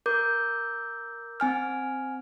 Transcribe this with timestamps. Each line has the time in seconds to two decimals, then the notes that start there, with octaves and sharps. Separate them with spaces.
0.06 A#4 D6 G6
1.40 C4 G#5 F6